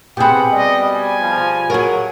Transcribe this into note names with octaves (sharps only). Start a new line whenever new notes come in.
B2 C4 G4 G#4 B4 F#5
G3 D#5
G#5
F3
F#3 G#4 A#4